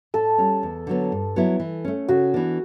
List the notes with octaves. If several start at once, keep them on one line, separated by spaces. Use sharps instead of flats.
A2 A4
G3 C#4
E2
D3 F#3 B3
G2
F#3 B3 E4
E3
A3 C#4
C#3 F#4
E3 B3 D4